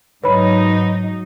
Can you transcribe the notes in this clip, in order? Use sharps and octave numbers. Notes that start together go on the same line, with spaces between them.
G#2 F#3 D#4 B4 C#5 B5